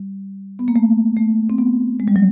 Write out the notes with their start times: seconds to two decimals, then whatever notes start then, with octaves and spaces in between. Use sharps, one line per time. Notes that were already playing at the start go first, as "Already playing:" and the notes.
Already playing: G3
0.59 B3
0.68 A#3
0.76 A3
1.17 A3
1.50 C4
1.58 B3
2.00 G#3
2.08 G3
2.16 F#3